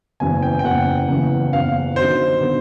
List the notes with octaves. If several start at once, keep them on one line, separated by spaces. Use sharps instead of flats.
F#1 E2 C#3 E3 G#5
G5
G5
F#1 E2 C#3 E3 F#5
F#1 E2 C#3 E3
F#1 E2 C#3 E3 F5
D3 F#3 B3 D#4 C5
D3 F#3 B3 D#4